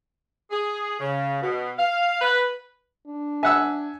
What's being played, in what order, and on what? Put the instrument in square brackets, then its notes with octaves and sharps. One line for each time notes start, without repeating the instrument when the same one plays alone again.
[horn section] G#4
C#3
B2
F5
B4
[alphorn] D4
[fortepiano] E5 F#5 E6 [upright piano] G#5